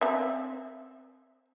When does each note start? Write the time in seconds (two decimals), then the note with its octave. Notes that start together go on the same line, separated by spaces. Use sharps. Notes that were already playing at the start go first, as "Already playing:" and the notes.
0.01 C4 E5